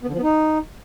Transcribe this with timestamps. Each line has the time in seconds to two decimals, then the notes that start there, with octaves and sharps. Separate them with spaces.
0.03 B3
0.08 D3
0.13 F3
0.18 B3
0.23 D#4